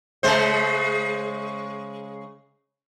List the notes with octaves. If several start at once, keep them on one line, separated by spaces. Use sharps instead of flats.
C#3 G#3 C5